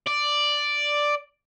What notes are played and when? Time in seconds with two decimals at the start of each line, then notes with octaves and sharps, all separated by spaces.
0.07 D5